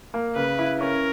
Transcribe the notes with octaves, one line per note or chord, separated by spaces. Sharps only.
A#3
C#3 B4
E4
C#4 A#4